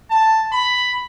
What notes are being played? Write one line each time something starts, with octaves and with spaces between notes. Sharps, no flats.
A5
B5